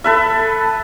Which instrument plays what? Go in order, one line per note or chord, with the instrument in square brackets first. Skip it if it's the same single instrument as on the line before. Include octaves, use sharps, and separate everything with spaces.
[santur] A4 B4 E5